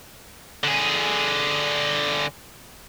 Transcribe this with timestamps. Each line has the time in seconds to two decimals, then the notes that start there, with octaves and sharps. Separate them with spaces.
0.64 D3 G#4